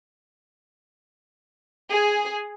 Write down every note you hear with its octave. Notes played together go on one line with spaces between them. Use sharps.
G#4